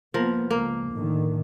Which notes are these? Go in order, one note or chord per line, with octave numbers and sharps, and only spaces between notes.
F3 A#3 B3 A#4
C#2 A#3
A2 D3 D#3